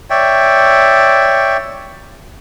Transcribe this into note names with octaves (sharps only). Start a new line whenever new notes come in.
C#5 D5 E5 G5